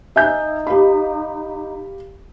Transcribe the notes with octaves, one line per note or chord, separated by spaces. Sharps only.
D#4 E5 G#5 G6
G4 F5 B5